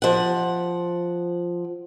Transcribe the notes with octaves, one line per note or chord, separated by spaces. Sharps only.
F3 F#5